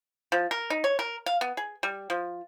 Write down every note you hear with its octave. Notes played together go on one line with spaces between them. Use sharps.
F3
A#4
D#4
C#5
A#4
F5
B3
G#4
G3
F3